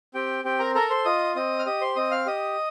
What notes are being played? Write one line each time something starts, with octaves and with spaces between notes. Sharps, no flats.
C4 G4 G5
C4 G4 G5
A#4 A#5
A4 A#4 A#5
C5 C6
F4 D#5 D#6
C4 D#5 D#6
F6
G4 D#5 D#6
C5 C6
C4 D#5 D#6
F5 F6
G4 D#5 D#6